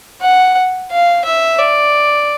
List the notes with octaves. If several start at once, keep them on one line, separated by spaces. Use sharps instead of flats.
F#5
F5
E5
D5